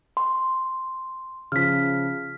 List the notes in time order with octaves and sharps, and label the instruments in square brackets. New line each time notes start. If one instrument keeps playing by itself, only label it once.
[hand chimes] C6
[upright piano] C#3 F3 [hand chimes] F6 B6